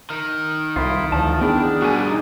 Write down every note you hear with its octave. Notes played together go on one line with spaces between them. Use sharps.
D#3
C2 E4 F4
D2 E3 F3 A5
B3 D4 E4 G#4 G5
G2 B2 F#4 G#5
D#4 G#4